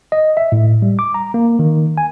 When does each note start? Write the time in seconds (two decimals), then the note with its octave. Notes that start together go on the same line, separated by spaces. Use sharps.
0.12 D#5
0.37 E5
0.52 A2
0.82 G3
0.99 D6
1.14 A#5
1.34 A#3
1.59 D#3
1.98 G#5